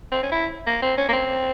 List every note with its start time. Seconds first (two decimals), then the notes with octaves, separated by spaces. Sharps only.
0.12 C4
0.23 C#4
0.32 E4
0.67 A#3
0.82 C4
0.98 C#4
1.09 A#3
1.13 C4